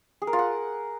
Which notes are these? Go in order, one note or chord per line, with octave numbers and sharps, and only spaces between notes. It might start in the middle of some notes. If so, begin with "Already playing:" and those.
G#4
A#4
F4
F#5